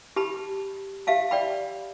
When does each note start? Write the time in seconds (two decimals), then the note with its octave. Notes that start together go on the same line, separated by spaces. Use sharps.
0.16 G4 A5 B5
1.07 G4 E5 F5 A5
1.31 D5 G5 B5